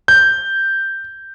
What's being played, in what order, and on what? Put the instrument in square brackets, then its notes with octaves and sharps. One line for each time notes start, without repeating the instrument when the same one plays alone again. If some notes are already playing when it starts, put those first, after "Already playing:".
[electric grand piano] G6